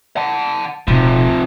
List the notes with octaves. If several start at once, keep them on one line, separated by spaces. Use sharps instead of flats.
F#5 A5
D1 B1 C3 F3